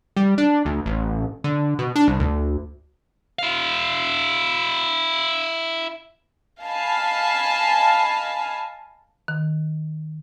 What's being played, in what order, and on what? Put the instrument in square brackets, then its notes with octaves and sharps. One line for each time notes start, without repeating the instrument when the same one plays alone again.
[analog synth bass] G3
D4
D2
A1
D3
B2
D4
C2
D2
[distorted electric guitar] E4 F5
[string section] D#5 F5 G#5 A5 B5
[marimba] D#3